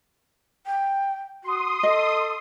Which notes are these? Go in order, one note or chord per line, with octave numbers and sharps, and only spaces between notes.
G5
F#4 C6 D#6
A4 D#5